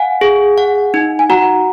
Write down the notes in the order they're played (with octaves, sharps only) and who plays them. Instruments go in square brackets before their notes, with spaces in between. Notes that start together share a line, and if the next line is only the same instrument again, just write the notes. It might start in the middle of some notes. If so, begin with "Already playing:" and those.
Already playing: [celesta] F5 G#5 [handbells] F#5
[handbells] G#4
F#5
D#4
[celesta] G#5
[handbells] F#4 [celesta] F#5 A#5